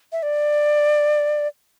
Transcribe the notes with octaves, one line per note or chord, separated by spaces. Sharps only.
E5
D5